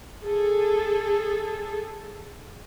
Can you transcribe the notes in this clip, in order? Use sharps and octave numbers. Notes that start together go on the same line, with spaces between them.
G#4 A4